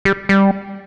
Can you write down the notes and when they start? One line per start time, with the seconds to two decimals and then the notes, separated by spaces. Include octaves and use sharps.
0.05 G3
0.29 G3